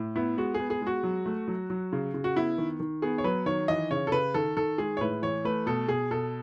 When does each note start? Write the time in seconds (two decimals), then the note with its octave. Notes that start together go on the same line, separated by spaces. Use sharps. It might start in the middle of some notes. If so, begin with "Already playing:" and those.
Already playing: A2
0.16 B3 E4
0.38 G#3 F#4
0.54 G#4
0.60 B3
0.70 G#4
0.82 G#3
0.87 F#4
1.03 F#3
1.26 A3
1.48 F#3
1.70 F#3
1.92 C#3
2.14 C#3
2.24 F#4
2.36 B3 E4
2.58 D#3
2.80 D#3
3.02 B3 G#4
3.18 C#5
3.24 F#3 B4
3.46 D#3 C#5
3.68 E3 D#5
3.91 C#3 C#5
4.07 A4
4.12 C#3 B4
4.34 D#3 A4
4.57 D#3 A4
4.78 G#3 G#4
4.97 C#5
5.01 A2 B4
5.22 E3 C#5
5.45 A3 B4
5.66 B2 A4
5.88 B2 G#4
6.11 B2 A4